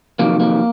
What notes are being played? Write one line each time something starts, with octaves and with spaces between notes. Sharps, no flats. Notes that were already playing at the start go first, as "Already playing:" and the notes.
F2 C3 D#3 F#3 A#3
A#3